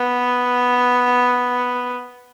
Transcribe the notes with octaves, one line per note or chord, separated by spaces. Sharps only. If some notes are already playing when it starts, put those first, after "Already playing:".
Already playing: B3